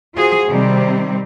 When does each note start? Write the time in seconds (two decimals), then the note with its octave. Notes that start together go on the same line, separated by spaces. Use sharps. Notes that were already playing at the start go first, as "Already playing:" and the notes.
0.15 F4 F#4 G#4 C5
0.47 C3 D#3 G3 C4